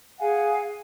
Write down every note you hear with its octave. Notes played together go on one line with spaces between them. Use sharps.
G#4 F5 F#5 G#5